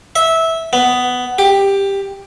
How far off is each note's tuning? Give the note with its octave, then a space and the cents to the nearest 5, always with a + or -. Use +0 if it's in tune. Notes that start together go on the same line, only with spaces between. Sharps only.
E5 -15
B3 +10
G4 +10